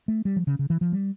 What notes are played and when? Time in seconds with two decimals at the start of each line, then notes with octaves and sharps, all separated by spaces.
0.08 A3
0.25 G3
0.36 F3
0.47 C#3
0.59 C#3
0.70 E3
0.81 F3
0.92 G3